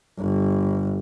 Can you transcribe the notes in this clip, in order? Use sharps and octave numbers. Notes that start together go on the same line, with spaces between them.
G1